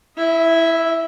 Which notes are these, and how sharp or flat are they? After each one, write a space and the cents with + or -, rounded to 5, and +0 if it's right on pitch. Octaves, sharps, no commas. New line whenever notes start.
E4 +0 E5 -45